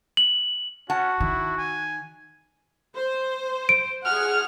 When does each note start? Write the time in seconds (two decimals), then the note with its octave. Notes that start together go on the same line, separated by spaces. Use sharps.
0.17 F#7
0.90 C#4 F#4 F#5 A5
1.20 D#3 E4
1.58 G#5
2.96 C5
3.69 D7
4.06 G#4 F#5 F6